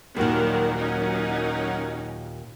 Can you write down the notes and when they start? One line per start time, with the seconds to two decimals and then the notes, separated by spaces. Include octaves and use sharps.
0.17 D#2 A#2 D#3 F#3 G3 A#4 F#5
0.78 C#4 D#4